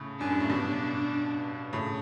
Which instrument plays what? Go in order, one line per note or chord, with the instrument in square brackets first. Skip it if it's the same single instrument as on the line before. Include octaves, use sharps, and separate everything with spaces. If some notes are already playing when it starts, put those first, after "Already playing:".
Already playing: [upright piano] A2 C#3
[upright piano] F#2 [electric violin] D4
[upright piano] G2
A2
G2 B2
A2 C#3